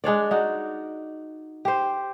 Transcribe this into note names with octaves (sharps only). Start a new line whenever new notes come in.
G#3 D4 C#5 D5
D#4 F#4 D5
G4 C5